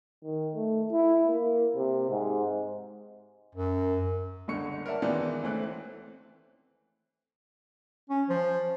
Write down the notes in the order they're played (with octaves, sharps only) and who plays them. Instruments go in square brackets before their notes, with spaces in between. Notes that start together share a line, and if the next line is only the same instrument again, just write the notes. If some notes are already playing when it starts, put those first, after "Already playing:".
[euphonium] D#3
A3
E4
A#3
C3
G#2
[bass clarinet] F#2
[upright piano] G1 C#2 D3 C#6 C#7
A#4 C#5 D5 E5 F#5 A5
D#3 E3 G#3 B3 F4 D5
D2 E3 A3 C4 C#4 F#6
[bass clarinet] C#4
F3